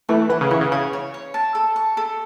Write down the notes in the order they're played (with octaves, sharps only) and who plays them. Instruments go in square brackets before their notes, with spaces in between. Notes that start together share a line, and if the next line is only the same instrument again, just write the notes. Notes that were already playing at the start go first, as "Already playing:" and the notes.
[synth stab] E3 A3 [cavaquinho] B4
[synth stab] E3 [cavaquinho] F#5
[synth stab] C#3
[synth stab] E3 [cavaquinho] C#6
[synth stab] C#3
[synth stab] C#3 [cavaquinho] C#5
[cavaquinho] C#5
C#5
A5
A4
C#6
A4